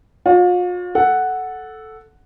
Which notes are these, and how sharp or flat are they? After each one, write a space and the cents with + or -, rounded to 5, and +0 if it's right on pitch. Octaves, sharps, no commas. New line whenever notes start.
F4 +40 C#5 +30
A4 -5 F#5 +0